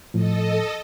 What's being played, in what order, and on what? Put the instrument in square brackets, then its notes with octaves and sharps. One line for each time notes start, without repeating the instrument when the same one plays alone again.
[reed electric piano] A2 F3 [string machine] A4 D#5